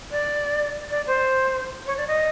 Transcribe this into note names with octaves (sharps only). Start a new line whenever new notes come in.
D5
D5
C5
C#5
D5
D#5